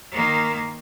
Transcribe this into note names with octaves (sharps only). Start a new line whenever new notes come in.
D#3 A#3